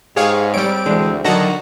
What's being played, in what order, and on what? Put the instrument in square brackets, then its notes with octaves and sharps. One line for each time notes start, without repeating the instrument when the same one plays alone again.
[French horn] G#2 [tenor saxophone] G#3 [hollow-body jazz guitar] G4 [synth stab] G#4 C#5 F5
[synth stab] G3 D7 [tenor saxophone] C4 [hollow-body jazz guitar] C#5
[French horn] D2 [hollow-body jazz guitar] E3 G#3 D4
[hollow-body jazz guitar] D3 F#3 [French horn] D#3 [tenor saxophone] F#4 [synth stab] D#5 A5 A#5